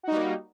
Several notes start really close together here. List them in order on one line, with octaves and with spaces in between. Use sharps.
F#4 D#4 G3 A#3